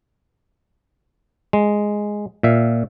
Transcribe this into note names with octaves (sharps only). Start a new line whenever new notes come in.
G#3
A#2 E5 F5